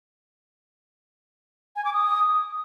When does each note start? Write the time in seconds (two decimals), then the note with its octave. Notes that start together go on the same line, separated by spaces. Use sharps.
1.76 G#5
1.85 D6
1.93 D#6